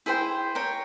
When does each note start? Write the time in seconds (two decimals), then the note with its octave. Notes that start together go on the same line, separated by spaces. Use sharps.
0.06 E4 G#4 C5 G5
0.55 C#5 G5 A#5